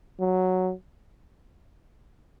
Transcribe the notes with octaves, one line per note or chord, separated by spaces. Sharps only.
F#3